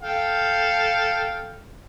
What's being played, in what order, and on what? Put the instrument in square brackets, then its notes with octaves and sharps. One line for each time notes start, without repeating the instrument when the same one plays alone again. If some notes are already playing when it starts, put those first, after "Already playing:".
[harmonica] A4 F5 G5